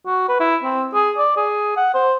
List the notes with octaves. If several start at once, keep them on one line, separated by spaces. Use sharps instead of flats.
F#4
B4
E4
C4
G#4
D5
G#4
F#5
C5